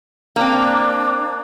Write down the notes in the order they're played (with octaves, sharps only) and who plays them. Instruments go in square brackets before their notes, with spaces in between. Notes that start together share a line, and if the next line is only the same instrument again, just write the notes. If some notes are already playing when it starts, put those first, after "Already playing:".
[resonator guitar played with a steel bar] A#3 C4 [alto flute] D4